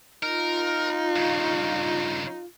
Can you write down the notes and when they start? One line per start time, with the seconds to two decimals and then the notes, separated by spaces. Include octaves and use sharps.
0.23 D#4 F4 A#4
1.16 G2 C#3